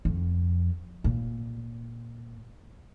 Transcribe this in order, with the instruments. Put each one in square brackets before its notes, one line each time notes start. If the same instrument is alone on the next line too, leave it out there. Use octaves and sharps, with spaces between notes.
[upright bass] F2
A#2